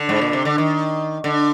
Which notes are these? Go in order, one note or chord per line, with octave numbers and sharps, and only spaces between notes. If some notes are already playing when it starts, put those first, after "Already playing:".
Already playing: D3
G#2
A#2
C3
D3
D#3
D3